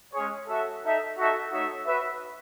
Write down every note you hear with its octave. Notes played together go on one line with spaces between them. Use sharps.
G#3 C#4 G#4 C#5
F#4 A4 E5
D#4 A4 E5
D#4 F#4 A4 E5
A3 D#4 F#4 C#5 E5
F#4 B4 E5